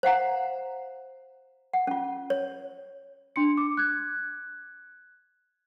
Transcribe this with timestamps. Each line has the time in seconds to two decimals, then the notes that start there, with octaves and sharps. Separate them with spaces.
0.03 C5 F5 F#5 A#5
1.73 F#5
1.87 C#4 F4
2.30 C#5
3.36 D4 C6 C#7
3.57 D6
3.77 F#6 G#6